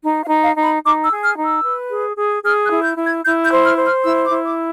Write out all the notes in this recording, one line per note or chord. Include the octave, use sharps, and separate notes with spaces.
D#4
F5
D#4
F5
D#4
B5
D#4 D6
E6
G#4
F6
D#4
E6
B4
G#4
G#4
G#4 F6
F#6
E4
G6
E4
G#6
E4 G6
G6
C5
F6
C5
F6
E4 E6
D6
E4
D6